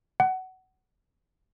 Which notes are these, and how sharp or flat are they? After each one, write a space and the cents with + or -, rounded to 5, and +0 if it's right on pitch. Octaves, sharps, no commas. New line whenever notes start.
F#5 +20